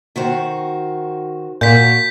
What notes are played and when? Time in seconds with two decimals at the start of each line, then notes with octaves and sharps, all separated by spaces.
0.16 D#3 F#4 C5
1.61 A#2 F#4 A#4 G6 B6